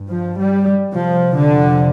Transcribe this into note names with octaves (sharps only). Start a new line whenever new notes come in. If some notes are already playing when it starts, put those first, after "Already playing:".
Already playing: G2
F3
G3
F2 C3 F3
D3